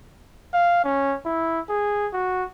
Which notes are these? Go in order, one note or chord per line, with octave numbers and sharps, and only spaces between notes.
F5
C#4
E4
G#4
F#4